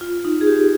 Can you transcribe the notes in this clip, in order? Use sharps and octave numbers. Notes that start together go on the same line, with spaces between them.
F4
D#4
G#4
G4